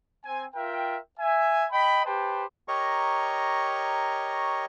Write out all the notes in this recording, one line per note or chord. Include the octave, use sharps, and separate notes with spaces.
C4 G#5
F4 A#4 E5 G5
E5 G#5
D#5 G5 B5
G4 B4 C5 G5 A5
G4 A#4 C#5 D#5 A#5 C#6